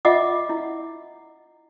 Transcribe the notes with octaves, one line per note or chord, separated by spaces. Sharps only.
F4 D#5 E5 F#5 D6
E4